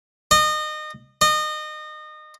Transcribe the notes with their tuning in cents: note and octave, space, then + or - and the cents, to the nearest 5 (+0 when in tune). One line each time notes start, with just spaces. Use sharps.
D#5 -30
D#5 -30